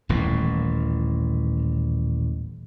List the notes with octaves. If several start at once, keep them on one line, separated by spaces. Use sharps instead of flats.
D#1 A1 A2